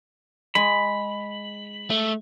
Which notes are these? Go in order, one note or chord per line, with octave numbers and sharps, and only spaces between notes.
G#3 B5
A3